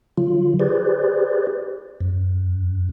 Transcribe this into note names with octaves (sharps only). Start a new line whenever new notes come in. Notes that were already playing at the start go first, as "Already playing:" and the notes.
D3 F#3 F4
G4 G#4 B4 C5 D5
F#2